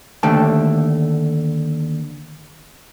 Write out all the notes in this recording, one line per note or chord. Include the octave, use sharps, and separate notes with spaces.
D#2 D3 A3 G5 A5